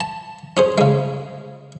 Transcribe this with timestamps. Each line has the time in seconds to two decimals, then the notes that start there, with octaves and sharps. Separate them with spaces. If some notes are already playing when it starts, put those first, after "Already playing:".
0.01 A5
0.57 C#4 G#4 C5
0.78 C#3 G#3